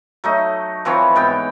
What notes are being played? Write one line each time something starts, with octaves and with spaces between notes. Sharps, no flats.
F#3 A3 D#4
E3 F3 C4 C#5
G#2 B3 G5